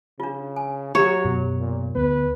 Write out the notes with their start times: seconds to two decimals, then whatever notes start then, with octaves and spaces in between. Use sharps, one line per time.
0.20 C#3 D4 F4
0.56 G#5
0.95 F#3 G4 C#5 E5 A#5
1.24 F#2 B2
1.59 A#2
1.95 D2 B3 B4